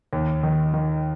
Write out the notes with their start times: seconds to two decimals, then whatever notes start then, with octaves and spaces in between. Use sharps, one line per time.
0.13 D#2
0.43 D#3
0.74 D#3